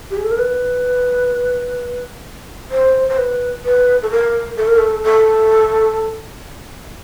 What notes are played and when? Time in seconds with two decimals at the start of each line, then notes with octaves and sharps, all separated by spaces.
0.10 G4
0.17 G#4
0.24 A4
0.31 A#4
0.38 B4
2.71 C5
3.09 C5
3.18 B4
3.64 B4
4.02 A4
4.11 A#4
4.57 A4
4.67 A#4
4.78 A4
5.03 A4